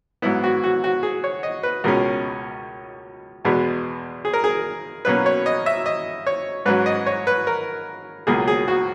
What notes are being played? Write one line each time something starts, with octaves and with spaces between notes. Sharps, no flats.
G#2 F#3 B3 E4
F#4
F#4
F#4
G#4
C#5
D#5
B4
C#2 B2 G#3 C#4 A#4
E2 B2 G#3 B3
G#4
A#4
G#4
B2 F#3 A#3 C#4 B4
C#5
D#5
E5
D#5
C#5
G#2 F#3 C#4 B4
D#5
C#5
B4
A#4
C#2 B2 F#3 A#3 G#4
G#4
F#4